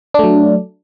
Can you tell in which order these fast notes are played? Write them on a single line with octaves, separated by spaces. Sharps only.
D4 A3 F#3